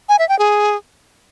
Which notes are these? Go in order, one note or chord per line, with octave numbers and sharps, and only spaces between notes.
G#5
E5
G5
G#4